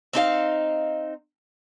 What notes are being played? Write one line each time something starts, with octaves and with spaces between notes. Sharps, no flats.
C4 D#4 G#4 F5